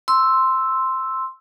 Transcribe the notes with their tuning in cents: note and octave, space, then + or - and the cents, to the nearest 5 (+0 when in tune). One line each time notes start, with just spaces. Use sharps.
C6 +0 E6 +0